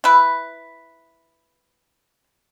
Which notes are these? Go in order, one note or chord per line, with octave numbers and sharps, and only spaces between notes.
E4 B4